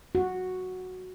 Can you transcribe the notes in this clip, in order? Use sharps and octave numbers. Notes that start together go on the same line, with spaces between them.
F#4